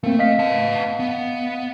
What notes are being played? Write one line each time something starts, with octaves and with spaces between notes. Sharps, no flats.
A3 A#3 C4
D#5 F5 B6
B3 A5
B3